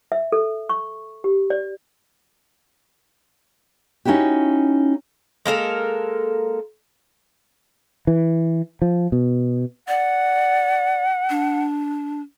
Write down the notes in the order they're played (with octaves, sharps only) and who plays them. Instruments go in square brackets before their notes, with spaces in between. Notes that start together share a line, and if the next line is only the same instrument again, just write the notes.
[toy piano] E5
A4
C#6
G4
D5
[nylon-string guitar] C#4 D#4 E4 F#4 G4
[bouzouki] G#3 A#3 A4 A#4
[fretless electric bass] E3
F3
B2
[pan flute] D5 [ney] F#5
[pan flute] D4